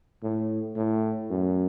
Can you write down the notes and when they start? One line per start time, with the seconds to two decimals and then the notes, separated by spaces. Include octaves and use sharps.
0.23 A2
0.76 A2
1.30 F#2